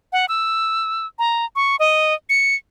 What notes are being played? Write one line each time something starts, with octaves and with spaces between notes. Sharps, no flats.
F#5
E6
A#5
C#6
D#5
C#7